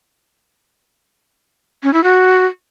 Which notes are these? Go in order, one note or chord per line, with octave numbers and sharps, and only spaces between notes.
C#4
E4
F#4